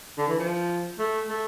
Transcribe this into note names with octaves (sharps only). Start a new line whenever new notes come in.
D3
E3
F3
A3
A3